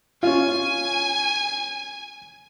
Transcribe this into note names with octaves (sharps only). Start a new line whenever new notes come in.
C#4 F4 G#5